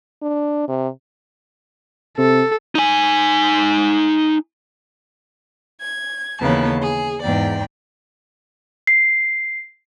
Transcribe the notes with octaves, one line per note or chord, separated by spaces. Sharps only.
D4
C3
C3 A4
D#4 G#5
G#6
D#2 C#3 E3 B3 A#4 A5
G#4
E2 G#2 D5 G5
C7